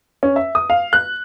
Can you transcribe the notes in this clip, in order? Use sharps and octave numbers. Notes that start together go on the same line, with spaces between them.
C#4
E5
D#6
F5
F#6